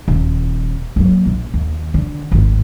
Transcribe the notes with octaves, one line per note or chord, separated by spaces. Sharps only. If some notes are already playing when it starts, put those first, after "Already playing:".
D#1
F#3 A#3
A#1
D#2
D3
G#1 D2